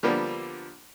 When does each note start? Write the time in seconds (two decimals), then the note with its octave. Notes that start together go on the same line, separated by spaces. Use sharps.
0.03 D3 F3 G3 A#3 B3